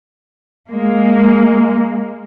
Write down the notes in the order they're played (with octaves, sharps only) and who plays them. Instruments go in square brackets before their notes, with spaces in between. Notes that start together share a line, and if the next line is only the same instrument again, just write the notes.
[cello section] G#3 A#3